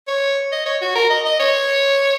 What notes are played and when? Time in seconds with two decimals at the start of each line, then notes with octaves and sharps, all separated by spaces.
0.08 C#5
0.52 D#5
0.66 C#5
0.81 F#4
0.95 A#4
1.10 D#5
1.25 D#5
1.39 C#5